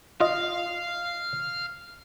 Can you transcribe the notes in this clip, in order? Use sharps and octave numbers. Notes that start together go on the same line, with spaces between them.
F4 D#5 F5